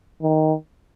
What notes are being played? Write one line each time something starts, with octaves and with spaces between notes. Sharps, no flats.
D#3